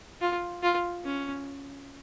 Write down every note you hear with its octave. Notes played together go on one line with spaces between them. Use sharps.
F4
F4
C#4